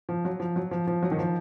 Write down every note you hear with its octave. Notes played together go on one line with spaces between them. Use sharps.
F3
F#3
F3
F#3
F3
F3
F#3
D#3
F3